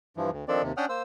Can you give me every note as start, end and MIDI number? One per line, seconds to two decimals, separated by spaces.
0.17 0.30 43
0.17 0.30 52
0.17 0.30 53
0.31 0.45 38
0.48 0.62 51
0.48 0.62 53
0.48 0.62 60
0.48 0.62 62
0.48 0.62 69
0.48 0.62 74
0.63 0.72 39
0.63 0.72 48
0.77 0.86 61
0.77 0.86 62
0.77 0.86 78
0.77 0.86 79
0.77 0.86 87
0.77 0.86 89
0.89 1.02 58
0.89 1.02 72
0.89 1.02 88